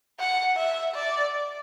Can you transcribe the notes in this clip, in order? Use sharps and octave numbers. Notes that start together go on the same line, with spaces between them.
F#5
E5
D5